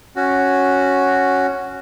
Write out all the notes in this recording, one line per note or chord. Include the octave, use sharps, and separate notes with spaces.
C#4 F#4